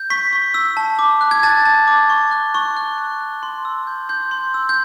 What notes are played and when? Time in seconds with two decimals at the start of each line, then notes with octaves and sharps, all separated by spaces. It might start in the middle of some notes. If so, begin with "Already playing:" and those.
Already playing: G6
0.10 C#6 B6
0.33 C#6
0.54 E6
0.77 A5
0.99 D6
1.21 F#6
1.31 G#6
1.43 A5 A6
1.65 A5
1.87 D6
2.10 C#6
2.31 F#6
2.55 C#6
2.77 F#6
2.98 C#6
3.21 F#6
3.43 C6
3.65 E6
3.87 G6
4.09 C6 G6
4.31 C6
4.54 E6
4.69 G6